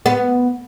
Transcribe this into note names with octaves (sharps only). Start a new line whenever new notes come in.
B3